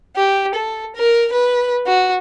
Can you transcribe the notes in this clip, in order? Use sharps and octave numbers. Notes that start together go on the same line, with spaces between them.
G4
A4
A#4
B4
F#4